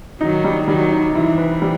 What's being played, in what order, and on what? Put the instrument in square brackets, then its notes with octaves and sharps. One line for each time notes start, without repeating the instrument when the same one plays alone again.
[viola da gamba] D#3 F#3 [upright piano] D#4
[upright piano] G3
[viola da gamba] D#3 F#3 [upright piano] G3
[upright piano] D#4
[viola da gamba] C3 E3 [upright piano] E4
[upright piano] B4
G3